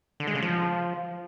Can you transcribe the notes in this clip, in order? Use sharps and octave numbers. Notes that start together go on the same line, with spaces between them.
D3
G#3
C#3
F3